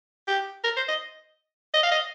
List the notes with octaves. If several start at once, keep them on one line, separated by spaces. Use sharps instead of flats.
G4
A#4
C5
D#5
D#5
F5
D#5